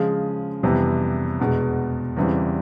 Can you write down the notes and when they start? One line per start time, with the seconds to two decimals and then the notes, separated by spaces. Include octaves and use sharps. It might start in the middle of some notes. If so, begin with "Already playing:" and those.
Already playing: C#3 F3 G#3
0.63 F2 C3 E3 G3 B3
1.40 E2 B2 G#3
2.17 E2 C#3 E3 G3 C4